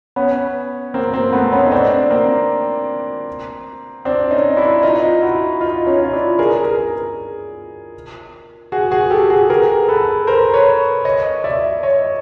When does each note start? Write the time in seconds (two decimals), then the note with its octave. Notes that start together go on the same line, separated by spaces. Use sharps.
0.16 B3 C#4
0.94 A#3 C4
1.14 A#3 C4
1.32 A3 B3
1.52 B3 C#4
1.66 D#4
1.72 C4 D4
2.10 A#3 C4
4.05 C4 D4
4.31 C#4 D#4
4.57 D4 E4
4.83 D#4 F4
5.22 E4 F#4
5.61 D#4 F4
5.87 C#4 D#4
6.04 F4
6.13 D4 E4
6.39 G#4 A#4
6.65 G#4 A#4
8.72 F#4 G#4
8.91 F#4 G#4
9.11 G4 A4
9.30 F#4 G#4
9.50 G#4 A#4
9.89 A4 B4
10.27 A#4 C5
10.53 B4 C#5
11.05 C#5 D#5
11.44 D5 E5
11.83 C#5 D#5